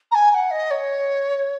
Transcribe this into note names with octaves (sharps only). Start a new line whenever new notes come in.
A#5
G#5
G#5
F#5
D#5
C#5